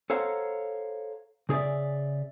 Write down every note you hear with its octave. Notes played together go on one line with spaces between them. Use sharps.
A4 C5 C#5 F5 F#5 A#5
C#3 G#4 C#5 D5 E5